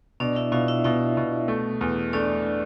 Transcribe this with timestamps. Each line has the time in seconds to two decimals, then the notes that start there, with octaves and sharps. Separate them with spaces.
0.20 B2 D4 D5
0.36 E4 E5
0.52 B2 F4 F5
0.68 E4 E5
0.84 B2 E4 E5
1.17 B2
1.48 A3
1.81 E2
2.13 A3 D4 D5